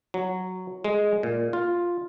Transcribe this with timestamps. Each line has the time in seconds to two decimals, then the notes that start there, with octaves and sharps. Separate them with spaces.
0.14 F#3
0.84 G#3
1.23 A#2
1.53 F4